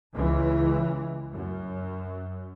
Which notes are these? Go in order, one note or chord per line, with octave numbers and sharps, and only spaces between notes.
C#2 E3
F#2